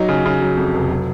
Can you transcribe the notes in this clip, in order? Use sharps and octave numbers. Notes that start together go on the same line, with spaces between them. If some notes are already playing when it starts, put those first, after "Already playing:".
Already playing: F#3 D#4
C#3
C#3
F#3
F2
F1
F#3